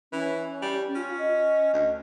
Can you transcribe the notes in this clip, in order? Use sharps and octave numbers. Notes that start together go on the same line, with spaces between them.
E3 C#4
G3
C#4 F4
D#5
D2